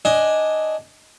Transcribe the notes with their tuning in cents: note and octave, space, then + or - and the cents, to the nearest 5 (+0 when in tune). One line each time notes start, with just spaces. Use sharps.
D4 +0 D#5 +10 G#5 +0